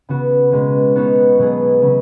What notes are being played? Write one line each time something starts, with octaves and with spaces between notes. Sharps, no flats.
C#3 B3 F#4
B2 G#3 C#4
B3 D#4 F#4 C#5
B2 F#3 B3 G#4
C#3 F#3 C#4